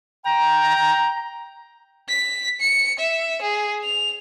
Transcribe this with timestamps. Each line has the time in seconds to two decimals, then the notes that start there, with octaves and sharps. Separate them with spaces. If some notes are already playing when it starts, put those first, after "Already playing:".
0.25 G5 A#5
2.09 B6
2.61 C#7
3.00 E5
3.42 G#4
3.85 F7